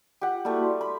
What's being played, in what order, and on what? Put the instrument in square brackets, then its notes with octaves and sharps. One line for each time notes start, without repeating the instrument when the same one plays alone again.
[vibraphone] F4 [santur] G4 F#5
[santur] G3 A3 [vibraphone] A#3 E4 F#4
[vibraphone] D5 C6
[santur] B5